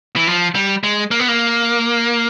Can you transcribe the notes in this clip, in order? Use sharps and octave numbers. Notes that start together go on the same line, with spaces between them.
E3
F3
G3
G#3
A#3
B3
A#3